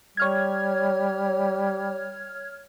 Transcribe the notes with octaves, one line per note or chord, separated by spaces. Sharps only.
G3 C#5 F6 G#6